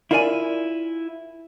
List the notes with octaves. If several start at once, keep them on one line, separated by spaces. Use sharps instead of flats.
E4 F4 A#4 D5 D#5 G#5